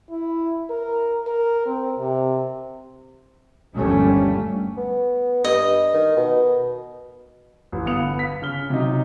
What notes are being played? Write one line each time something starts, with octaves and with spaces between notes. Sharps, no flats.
E4
A#4
A#4
C4
C3
G1 D#2 F3 G3 A3 C#4
B3
G2 D#5
D#3
B2
A1
G1 B3 F5 D#6 C#7 F7
B6
C#3 F6 G7
C3 F#3 D#4